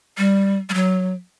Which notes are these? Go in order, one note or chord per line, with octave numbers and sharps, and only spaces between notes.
G3
G3
F#3